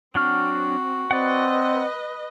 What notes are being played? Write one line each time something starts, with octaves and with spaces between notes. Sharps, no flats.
F#3 C4 D4 F#4 F6
C4 B4 D5 D#5 F#5